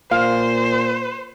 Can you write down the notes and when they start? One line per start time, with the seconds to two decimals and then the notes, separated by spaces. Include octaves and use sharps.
0.11 A#2 C5 F5